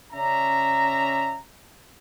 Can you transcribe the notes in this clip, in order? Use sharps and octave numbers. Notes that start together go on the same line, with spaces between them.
C#3 C#4 D5 E5 A#5